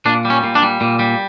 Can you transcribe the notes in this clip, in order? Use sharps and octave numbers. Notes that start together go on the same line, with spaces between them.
A#2 D4
G3
C#4
A#2
D4
G3
A#2
G3